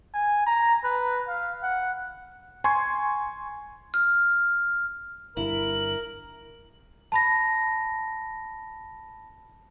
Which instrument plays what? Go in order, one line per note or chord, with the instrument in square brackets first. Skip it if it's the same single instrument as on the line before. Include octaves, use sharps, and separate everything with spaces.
[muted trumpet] G#5
A#5
B4
F5
F#5
[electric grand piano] G#5 C6 C#6 G#6
[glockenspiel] F6
[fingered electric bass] G1 G2 [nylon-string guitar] E4 [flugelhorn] A#4 [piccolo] F#7
[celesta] A5 B5 A#6